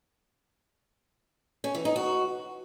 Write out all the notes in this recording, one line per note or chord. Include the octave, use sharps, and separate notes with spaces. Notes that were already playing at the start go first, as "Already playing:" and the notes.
C#4
E3
D#4
F#4